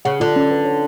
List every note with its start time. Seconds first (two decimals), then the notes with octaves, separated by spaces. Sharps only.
0.05 C#3 F#5
0.20 D3 F4
0.36 C#4
0.51 B4
0.65 C#5